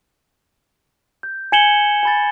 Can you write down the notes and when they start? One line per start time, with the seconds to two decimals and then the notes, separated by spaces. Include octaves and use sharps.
1.23 G6
1.52 G#5 G#6 C#7 E7 F#7 G7
2.03 G#5 B5 A6